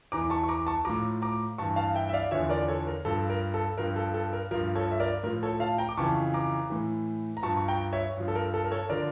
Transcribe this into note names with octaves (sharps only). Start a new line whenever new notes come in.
E2 E3 A#5 D6
A5 C#6
C#6
A#5 D6
A5 C#6
A2 F3 A#5 D6
A#5 D6
G2 E3 A5 C#6
F5 A5
E5 G5
E5
D5 F5
E2 D3 F3 C#5 E5
A#4 D5
A4 C#5
A#4
G2 F3 A4
A#4
A4
G2 F3 A#4
A4
A4
A#4
G2 F3 A#4
A4 C#5
E5
A#4 D5
A2 F3 A#4
A4 C#5
F5 A5
G5 A#5
D6
F2 C#3 E3 A5 C#6
A#5 D6
A2 E3
A#5
G2 F3 A5 C#6
C#6
G5 A#5
C#5 E5
G2 F3
A4
A#4
A4
A#4
A4 C#5
D3 F3 A#4 D5